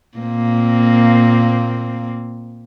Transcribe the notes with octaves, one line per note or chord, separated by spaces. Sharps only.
A#2 A#3 C4